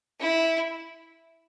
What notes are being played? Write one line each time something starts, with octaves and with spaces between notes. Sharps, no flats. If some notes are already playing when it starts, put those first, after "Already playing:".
E4